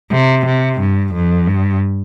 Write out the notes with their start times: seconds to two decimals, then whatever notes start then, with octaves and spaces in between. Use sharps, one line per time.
0.12 C3
0.46 C3
0.80 G2
1.14 F2
1.47 G2